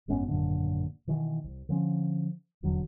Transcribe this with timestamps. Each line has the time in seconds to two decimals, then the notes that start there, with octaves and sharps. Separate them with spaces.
0.08 F#1 G#2 B3 C#4
0.28 G#1 F#2 A#2 D3
1.07 B2 D#3 E3
1.44 C2
1.69 D3 F3 C#4
2.63 D#1 E2 D3 F#3